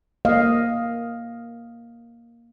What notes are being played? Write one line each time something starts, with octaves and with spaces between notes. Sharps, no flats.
A#3 D#5 F5